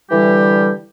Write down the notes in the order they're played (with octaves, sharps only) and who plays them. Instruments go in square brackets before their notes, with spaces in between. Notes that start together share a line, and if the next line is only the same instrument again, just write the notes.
[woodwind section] D3 E3 G3 G4